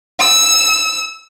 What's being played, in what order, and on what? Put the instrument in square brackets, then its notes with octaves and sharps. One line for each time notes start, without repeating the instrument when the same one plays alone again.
[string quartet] E6